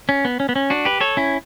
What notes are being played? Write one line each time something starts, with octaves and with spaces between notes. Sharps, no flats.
C#4
B3
C#4
B3
C#4
D4 F#4
G4 B4
A4 C#5
C#4 E4